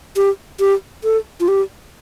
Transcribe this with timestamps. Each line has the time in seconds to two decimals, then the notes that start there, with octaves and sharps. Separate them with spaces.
0.16 G4
0.60 G4
1.04 A4
1.40 F4
1.48 G4